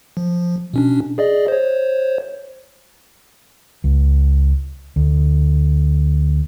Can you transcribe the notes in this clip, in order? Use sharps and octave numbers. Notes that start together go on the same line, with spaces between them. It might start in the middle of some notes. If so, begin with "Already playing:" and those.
F3
B2 C#4 D4
G#4 D5 D#5
C5 C#5
C#2
D2